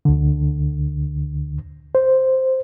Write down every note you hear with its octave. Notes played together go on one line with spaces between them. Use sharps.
D2 D3
C5